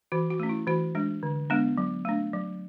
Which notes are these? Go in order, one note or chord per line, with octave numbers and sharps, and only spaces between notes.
E3 F#4
F#4
A3 C#4
E4
E3 F#4
G#3 D4
D3
G#3 B3 D4
F#3
A3 D4
F#3